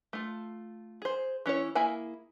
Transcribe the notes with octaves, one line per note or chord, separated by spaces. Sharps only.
A3 F4
G#4 C5
E3 C#4 E4 C#5
A#3 E4 G#4 E5 G#5